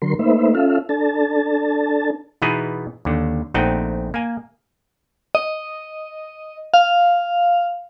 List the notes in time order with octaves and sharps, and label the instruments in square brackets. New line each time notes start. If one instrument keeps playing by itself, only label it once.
[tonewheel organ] D3 F#3 A#4 C6
A3 A#3 D#4 B4 C5 E5
C#4 F4 A4 E5 F5
D4 A4 A5
[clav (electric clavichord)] B2 E3 B3 D#4 G#4
D#2 D3
A#1 A3 C4 D#4 F#5 G5
A#3 G#5
[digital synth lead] D#5
F5